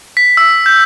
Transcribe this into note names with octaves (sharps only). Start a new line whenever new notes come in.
B6
E6
G6